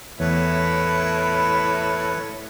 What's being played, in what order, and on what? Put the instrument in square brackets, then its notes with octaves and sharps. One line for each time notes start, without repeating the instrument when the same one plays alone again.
[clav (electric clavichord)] E2 [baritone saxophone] A2 [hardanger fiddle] E4 [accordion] B4 C#5